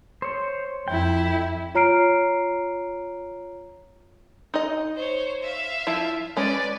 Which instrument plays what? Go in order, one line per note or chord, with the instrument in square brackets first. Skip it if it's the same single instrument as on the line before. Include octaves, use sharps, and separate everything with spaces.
[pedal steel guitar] C5 C#5
[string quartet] F2 E4 [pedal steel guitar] G5
[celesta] F4 C#5 A#5 F6 C7 D7
[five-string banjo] D#4 D#5
[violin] C5 C#5
E5 F5
[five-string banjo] F3 E4
[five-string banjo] G#3 C#4 [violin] B4 D5